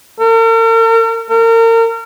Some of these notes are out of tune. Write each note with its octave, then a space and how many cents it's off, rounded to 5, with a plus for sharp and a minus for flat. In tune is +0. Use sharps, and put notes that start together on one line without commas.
A#4 -45
A#4 -35